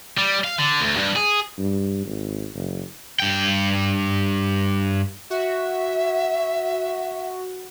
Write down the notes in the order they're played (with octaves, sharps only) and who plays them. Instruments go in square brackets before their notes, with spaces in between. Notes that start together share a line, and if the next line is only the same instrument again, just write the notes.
[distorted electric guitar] G3
F5
D3
D2
G2
G#4
[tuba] G2
G#1
F#1
[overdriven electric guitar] G2 G5
[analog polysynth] F#4 [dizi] E5